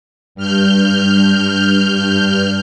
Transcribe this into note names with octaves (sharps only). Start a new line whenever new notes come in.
G2 F6 G6